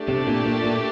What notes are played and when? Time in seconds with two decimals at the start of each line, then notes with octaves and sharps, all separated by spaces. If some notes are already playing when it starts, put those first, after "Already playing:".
Already playing: A3 D4 G4 D5
0.09 C3
0.27 A#2
0.46 A#2
0.64 A#2